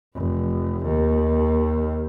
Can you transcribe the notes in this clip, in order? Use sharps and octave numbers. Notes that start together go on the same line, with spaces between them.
F1
D#2